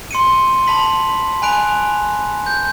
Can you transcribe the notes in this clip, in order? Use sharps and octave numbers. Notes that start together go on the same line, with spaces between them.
C6 C#7 D#7
A5 B5 B6 F#7
G#5 B5 F#6 D7 F7
G6